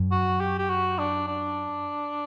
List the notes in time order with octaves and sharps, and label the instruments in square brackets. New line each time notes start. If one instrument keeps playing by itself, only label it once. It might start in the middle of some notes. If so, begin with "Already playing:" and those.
Already playing: [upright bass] F#2
[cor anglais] F#4
G4
G4
F#4
D4
D4